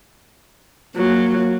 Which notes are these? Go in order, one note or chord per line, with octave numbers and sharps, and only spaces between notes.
F#3 A#3